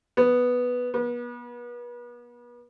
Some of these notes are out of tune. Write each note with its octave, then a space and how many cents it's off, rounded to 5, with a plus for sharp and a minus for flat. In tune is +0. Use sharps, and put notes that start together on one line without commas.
B3 +0
B3 -35